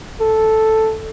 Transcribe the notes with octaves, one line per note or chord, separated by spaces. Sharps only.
A4